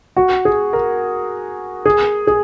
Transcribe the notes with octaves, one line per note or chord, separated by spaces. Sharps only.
F#4
G#4
A#4
G#4
G#4